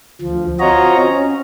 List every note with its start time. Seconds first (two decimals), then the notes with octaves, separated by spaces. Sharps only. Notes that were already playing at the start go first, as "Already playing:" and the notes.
0.21 D2 F3
0.60 C4 F4 F#4 C#5 D#5 A#5
1.01 C#4